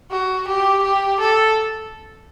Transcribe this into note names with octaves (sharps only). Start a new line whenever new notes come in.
F#4
G4
G4
A4